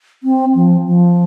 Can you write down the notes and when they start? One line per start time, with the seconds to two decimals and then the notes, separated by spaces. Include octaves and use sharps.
0.23 C4
0.55 F3
0.86 F3